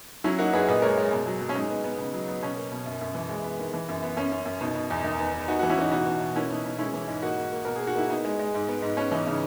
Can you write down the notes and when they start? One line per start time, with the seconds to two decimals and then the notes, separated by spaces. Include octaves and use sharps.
0.24 F#3 C#4 E4
0.39 A#3 D#4 F#4
0.53 F#2 G#4 B4
0.68 A#2 B4 D#5
0.82 G#3 A#4 C#5
0.98 G#3
1.12 B2
1.27 F#3
1.41 F#3
1.49 C#4
1.55 G#3 D#4
1.70 B3
1.84 B3
1.98 C#3
2.13 F#3
2.28 B3
2.42 B2 C#4
2.57 A#3
2.71 B2
2.86 F#2
3.01 F#2
3.15 E3
3.29 G#3
3.44 B3
3.59 D#3
3.74 E3
3.89 F#2
4.03 B3
4.17 F#2 C#4
4.32 F#2
4.46 F#2
4.61 B2 D#4
4.75 B2
4.91 E2
5.04 D#3 D#4
5.19 B3
5.34 B3
5.48 B3 D#4 F#4
5.59 E3 D#4 F#4
5.69 C#4 E4
5.78 E3 D#4 F#4
5.91 B2 D#4 F#4
6.06 B2
6.20 B2
6.36 A#3 C#4 E4
6.50 B2 D#4
6.65 B2
6.79 G#3 C#4 E4
6.93 E3
7.08 G#2
7.22 A#3 D#4 F#4
7.37 A#3
7.52 A#3
7.65 B2 A#4
7.76 A#3 G#4
7.87 F#4
7.95 A#3 E4
8.10 B3 D#4
8.25 G#3
8.39 G#3
8.54 G#2
8.68 B3
8.82 G#2
8.97 B3 C#4
9.12 E3 D#4
9.27 C#3 D#4